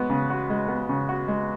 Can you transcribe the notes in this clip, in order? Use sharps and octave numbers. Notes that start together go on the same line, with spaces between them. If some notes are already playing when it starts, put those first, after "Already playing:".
Already playing: G#3 B3 F#4
C#3
F#4
G#3
B3
C#3
F#4
G#3